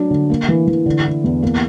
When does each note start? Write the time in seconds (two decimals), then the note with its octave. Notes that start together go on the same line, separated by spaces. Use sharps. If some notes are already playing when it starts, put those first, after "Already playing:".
Already playing: F#3 D4
0.11 D3
0.30 A#3
0.48 E3
0.68 E3
0.86 D3
1.05 E4
1.24 E2
1.43 A#3